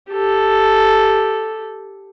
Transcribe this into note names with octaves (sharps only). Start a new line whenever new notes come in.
G4 A4